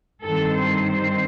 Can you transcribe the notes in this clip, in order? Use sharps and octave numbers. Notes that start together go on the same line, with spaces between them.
G2 D#3 G3 C4 A4
C5